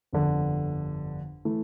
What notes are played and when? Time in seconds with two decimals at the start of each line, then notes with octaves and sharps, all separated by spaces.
0.13 G1 F2 D3
1.45 E3 A3